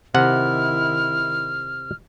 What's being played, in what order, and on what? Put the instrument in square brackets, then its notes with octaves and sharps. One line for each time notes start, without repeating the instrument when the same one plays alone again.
[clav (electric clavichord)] C3 F#5 [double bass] D#3 E4 [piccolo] F6